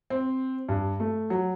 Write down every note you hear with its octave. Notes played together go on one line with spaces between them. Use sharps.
C4
G2
A3
F#3